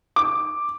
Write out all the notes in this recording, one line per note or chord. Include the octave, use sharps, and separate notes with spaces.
D6